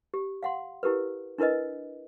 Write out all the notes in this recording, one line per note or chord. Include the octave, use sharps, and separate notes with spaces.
G4
F5 F#5 C6
E4 G4 A#4 B4
D4 E4 A#4 B4 D#5